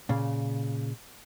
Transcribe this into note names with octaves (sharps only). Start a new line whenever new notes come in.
A#2 C#3